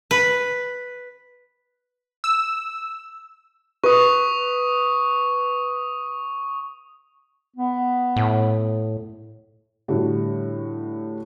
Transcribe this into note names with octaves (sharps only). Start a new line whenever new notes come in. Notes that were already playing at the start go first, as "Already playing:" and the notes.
B4
E6
B4 C#6 D#6
B3
A2
A2 D3 G3 F#4